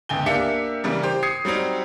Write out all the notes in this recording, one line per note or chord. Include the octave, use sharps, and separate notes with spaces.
G1 C#2 G5 G#5 G7
A#3 D4 G4 E5 F5 C#7
C#3 E3 G3 A#4
G4 C5
D#6 G#6 C7 C#7
F#3 G3 C4 D#4